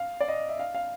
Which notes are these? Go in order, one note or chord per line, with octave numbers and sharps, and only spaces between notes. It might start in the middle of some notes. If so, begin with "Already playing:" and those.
Already playing: F5
D5
D#5
E5
F5
F5